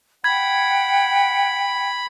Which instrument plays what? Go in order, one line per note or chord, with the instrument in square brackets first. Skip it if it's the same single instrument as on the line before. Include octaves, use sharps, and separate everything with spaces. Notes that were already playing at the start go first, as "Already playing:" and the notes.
[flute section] F#5 G5 [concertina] B5 [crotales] G#6